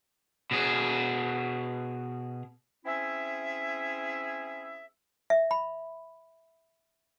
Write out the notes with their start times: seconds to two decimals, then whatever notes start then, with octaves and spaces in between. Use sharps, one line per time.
0.51 B2 G#4
2.86 C4 C#4 E4 G#4 E5
5.30 E5
5.51 B5